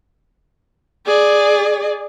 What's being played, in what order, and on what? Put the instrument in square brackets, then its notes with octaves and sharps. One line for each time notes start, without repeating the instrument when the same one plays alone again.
[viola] G#4 D5